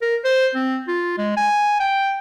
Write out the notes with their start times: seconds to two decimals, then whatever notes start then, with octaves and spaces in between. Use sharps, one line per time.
0.02 A#4
0.25 C5
0.55 C4
0.88 F4
1.18 G#3
1.37 G#5
1.80 G5